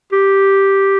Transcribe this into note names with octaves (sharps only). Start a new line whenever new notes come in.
G4